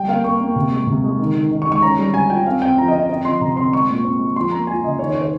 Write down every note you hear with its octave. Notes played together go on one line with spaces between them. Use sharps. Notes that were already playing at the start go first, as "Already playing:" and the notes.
Already playing: G3 G5
A#3 F5
A#3 C#6
A#3
C3
G#3
C3
G#3
D#3
D#3
D#3
C#6
G#3
C#6
C#4 A#5
G3
G3 G#5
F4 G5
C4 F5
C4 G5
F3 A#5
D#5
C4
D#5
C4 D#5
F3 C6
C3 A#5
C4 C6
G#3 C#6
A#2
C4
G#3
F3 C6
A#3 A#5
F4 G#5
C#3 D#5
D#3 C#5
C#5
D#3
C5